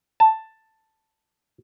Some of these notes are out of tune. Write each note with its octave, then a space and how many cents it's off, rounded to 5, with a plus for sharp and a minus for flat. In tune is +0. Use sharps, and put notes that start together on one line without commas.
A5 +5